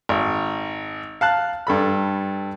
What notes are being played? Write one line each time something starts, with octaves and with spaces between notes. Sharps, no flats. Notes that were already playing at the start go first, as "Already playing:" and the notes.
G#1
F5 A5 F#6
G2 A4 B5